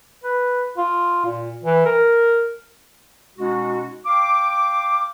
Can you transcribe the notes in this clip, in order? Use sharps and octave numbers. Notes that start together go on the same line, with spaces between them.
B4
F4
A#2
E3
A#4
B2 G#3 C#4 D#4 F#4
F5 G5 D6